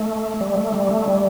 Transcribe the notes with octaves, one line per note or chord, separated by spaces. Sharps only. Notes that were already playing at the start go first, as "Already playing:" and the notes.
Already playing: A3
G3
A3
G3
A3
G3